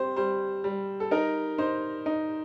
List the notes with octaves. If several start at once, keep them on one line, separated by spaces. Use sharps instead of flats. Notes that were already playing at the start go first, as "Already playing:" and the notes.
Already playing: G3 C4 C5
G3 C5
G3
A4
D#4 A#4
D#4 C5
D#4